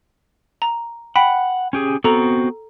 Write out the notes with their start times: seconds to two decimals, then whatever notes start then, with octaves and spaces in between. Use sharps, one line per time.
0.62 A#5
1.16 F#5 G5 B5 B6
1.73 C#4 G4 G#4
2.04 B3 C4 F#4 A4 A#5